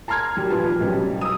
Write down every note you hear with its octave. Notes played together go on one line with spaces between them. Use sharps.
A5 A#5 C6 F6 G#6
D#3 F#3 G3
A#2 F3 B4 A5
B1 G3 C#4
D#6 E6